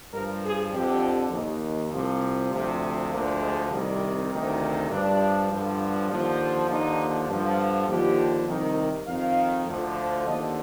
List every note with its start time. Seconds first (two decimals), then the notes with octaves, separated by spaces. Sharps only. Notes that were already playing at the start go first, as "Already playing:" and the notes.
0.13 G2 F3 A#4
0.44 G#4
0.73 F2 D3 F3 G4
1.32 D#2 D#3
1.92 C2 C3 F3
2.52 D2 C3 F3
3.12 D2 D3 F3 A#3
3.41 G#3
3.71 C2 C3 D#3 G3
4.31 D2 C3 D#3
4.90 G2 F3 D4
5.50 G2 D3 F3
6.09 D#2 D3 F3
6.69 D#2 D3 F3 D#4
7.29 G2 D3 F3
7.88 D#2 D3 F3 G4
8.48 C2 C3 D#3
9.07 F2 D#3 F5
9.67 D2 D3 F3
10.27 D#2 D3 F3 D#5